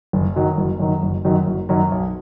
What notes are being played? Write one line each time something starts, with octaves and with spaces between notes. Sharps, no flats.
F#1
F#2 D#3 F#3
F#1
F#2 D#3 F#3
F#1
F#2 D#3 F#3
F#1
F#2 D#3 F#3
B1